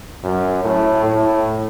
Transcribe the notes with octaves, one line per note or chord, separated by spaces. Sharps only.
F#2
A2
A2